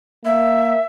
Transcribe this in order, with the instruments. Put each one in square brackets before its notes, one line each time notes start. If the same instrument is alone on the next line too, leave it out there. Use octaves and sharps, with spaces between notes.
[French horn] A#3 [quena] E5